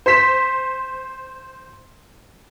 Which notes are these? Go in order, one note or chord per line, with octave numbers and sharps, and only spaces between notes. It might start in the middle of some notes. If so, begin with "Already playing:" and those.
C5 C6 B6 E7